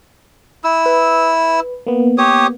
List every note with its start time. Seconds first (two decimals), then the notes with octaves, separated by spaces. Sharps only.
0.64 E4 E6
0.86 B4
1.87 A#3 B3
2.18 G4 C#5 D#6